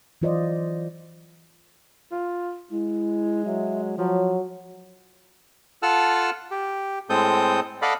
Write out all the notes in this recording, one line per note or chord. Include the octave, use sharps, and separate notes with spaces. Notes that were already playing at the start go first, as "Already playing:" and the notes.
E3 F#3 F4 C5 D5 D#5
F4
G#3 E4
F#3 E5
F3 F#3 C#5
F4 A4 F#5 A5 E6 F6
G4
A2 G#3 C4 A4 D#6 G6
A4 D5 D#5 F5 F#5 B5